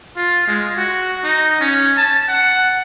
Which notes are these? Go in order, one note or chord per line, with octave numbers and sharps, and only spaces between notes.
F4
G#3
F#4
D#4
C#4
A5
F#5